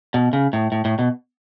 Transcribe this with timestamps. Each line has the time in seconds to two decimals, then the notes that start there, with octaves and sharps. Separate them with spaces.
0.14 B2
0.33 C#3
0.53 A2
0.72 A2
0.85 A2
0.99 B2